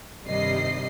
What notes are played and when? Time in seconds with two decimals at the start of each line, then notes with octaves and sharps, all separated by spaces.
0.23 G2 C3 D#3 G3 D#5 C7